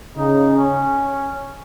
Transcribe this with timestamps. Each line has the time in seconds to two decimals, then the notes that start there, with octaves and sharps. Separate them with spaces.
0.17 C#3 D#4
0.57 C#4